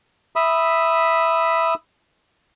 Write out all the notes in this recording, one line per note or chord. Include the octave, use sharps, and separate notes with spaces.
E5 B5 D#6